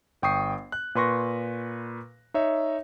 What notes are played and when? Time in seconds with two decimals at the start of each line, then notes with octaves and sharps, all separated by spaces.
0.22 G1 G5 C#6 D#6 C7
0.72 F#6
0.95 A#2 B4 C6 C#6 A#6
2.34 D#4 C#5 E5